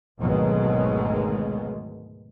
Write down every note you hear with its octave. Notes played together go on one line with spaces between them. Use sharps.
G#1 D2 B2 D#3 F#3 G#3